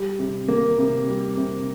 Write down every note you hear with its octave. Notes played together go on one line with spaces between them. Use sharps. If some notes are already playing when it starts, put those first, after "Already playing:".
Already playing: G3
C3
A#3
C3
G3
C3